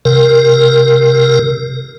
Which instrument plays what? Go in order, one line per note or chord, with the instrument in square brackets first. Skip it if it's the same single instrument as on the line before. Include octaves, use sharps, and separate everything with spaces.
[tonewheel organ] C3 A#4